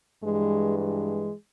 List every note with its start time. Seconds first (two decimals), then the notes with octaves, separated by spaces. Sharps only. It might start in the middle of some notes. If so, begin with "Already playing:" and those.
0.22 G2 E3 G#3
0.77 G#3